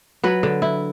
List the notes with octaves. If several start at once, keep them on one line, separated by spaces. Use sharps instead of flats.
F#3 B4
D3
E4